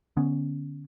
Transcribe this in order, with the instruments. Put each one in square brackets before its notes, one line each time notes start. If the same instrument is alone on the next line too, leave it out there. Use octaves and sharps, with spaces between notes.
[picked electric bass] D3 B3 C#4